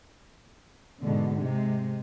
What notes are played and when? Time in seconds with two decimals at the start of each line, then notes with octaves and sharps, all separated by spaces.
1.03 G#2 B2 D3
1.39 C3 G#3